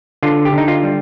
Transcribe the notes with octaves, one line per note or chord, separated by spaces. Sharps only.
D3 F4
G4
D3 D#4
F4
G3